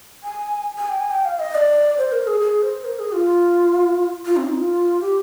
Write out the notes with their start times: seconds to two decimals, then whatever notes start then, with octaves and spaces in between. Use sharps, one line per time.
0.24 G#5
0.78 G#5
0.89 G5
1.00 G#5
1.11 G5
1.25 F5
1.39 D#5
1.55 D5
1.98 C5
2.12 A#4
2.27 G#4
2.41 G#4
2.62 C5
2.85 A#4
2.99 G#4
3.14 F4
4.25 F4
4.37 C4
4.47 D#4
4.58 F4
5.01 G4